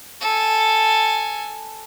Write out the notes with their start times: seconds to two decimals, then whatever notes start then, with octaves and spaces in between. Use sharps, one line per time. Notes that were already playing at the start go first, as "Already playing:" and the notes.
0.21 A4 G#5